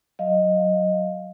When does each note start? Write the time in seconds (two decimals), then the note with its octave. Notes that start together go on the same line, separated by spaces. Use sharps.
0.19 F#3 D#5 F5